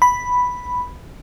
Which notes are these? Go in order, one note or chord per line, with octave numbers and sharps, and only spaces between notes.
B5